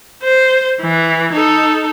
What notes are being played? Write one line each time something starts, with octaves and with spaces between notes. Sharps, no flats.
C5
E3
D#4 A4